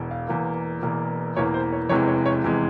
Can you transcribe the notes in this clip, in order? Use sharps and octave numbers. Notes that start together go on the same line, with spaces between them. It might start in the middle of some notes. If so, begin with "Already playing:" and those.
Already playing: E1 E2 E3
F5
E1 E2 E3 A#3
E1 E2 E3 A#3
E1 E2 E3 A#3 C#5
C5
C#5
F1 E2 C3 E3 G#3 C#5
C#5
C#5
F1 E2 C3 E3 G#3